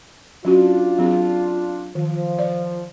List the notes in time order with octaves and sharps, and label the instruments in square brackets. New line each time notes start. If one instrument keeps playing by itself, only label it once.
[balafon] F#3 C#4 F#4 [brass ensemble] D4 F4
[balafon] F#3 C4 G#4
[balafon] D#3 [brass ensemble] F3
[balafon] D5